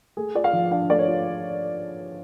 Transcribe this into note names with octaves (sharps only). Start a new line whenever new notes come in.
A3 G#4
F4 D5
F5
F3
D4 F5
A3 D5
C#5
F4